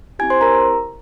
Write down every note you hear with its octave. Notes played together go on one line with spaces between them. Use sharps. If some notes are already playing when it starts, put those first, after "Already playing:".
C4 E4 G4 G#5 G#6
C5 C6
A#4 A#5